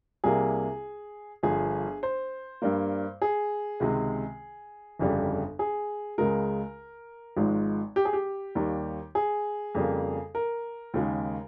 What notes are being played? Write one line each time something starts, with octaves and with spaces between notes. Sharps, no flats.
C2 C3 G3 A#3 G#4
G1 G2 F3 G#4
C5
G2 G3 A#3
G#4
C#2 C3 D#3 G#3
G1 F2 C#3 G3
G#4
C#2 C#3 G#3 A#4
G#1 G#2 F3 G#3
G4
G#4
G4
D#2 D#3 G3 A#3
G#4
F2 C#3 G3 A#3
A#4
D#2 C#3 G#3